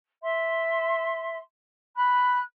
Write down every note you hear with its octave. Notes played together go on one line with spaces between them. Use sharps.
E5 C6
B5 F#6